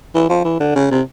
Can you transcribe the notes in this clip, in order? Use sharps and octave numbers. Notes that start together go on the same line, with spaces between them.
E3
F3
E3
D3
C#3
C3